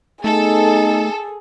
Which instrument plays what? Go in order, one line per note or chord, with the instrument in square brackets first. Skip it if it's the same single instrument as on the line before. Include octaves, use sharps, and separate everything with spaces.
[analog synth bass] A3 [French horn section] B3 D#4 [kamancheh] G#4 [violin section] A4